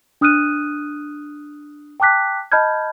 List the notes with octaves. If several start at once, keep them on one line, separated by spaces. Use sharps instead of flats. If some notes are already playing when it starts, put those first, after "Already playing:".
D4 D#6 F6 F#6 D#7
G5 A5 D6 F#6 B6
D#5 A5 B5 F6 G6 G#6